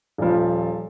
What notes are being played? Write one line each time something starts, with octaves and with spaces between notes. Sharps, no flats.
D#1 F3